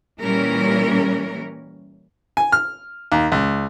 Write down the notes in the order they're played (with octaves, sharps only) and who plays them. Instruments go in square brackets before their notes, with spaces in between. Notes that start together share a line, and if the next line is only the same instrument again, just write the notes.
[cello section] A#2 E3 G3 C#4 A#4
[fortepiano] G#5
F6
D#2
C#2